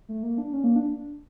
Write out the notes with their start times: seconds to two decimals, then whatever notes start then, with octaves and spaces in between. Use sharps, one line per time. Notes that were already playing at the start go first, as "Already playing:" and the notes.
0.09 A3
0.23 A#3
0.38 D4
0.53 C#4
0.64 A#3
0.76 D4